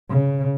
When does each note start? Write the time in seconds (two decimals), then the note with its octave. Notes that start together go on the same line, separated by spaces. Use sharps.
0.10 C#3